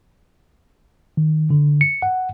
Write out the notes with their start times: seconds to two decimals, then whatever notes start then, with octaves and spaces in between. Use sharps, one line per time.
1.17 D#3
1.50 D3
1.81 C#7
2.02 F#5